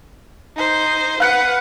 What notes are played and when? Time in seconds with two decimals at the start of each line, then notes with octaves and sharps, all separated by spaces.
0.56 D#4 C5
1.20 B4 F5 F#5 F#6 C#7